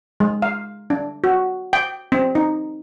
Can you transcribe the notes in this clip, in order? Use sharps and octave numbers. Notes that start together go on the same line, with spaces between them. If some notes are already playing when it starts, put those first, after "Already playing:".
G#3
F5
D4
F#4
G5
C4
D#4